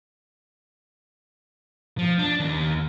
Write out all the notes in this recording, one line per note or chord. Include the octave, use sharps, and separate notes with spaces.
F3
D4
D#2